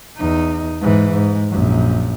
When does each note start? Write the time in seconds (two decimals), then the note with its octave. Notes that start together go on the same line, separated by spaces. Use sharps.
0.18 E2 D#4
0.81 G#2 E3
1.13 G#2
1.50 A#1 F#2